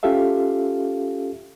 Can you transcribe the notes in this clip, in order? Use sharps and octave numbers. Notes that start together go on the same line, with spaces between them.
C#4 F4 G4 A4 E5 F5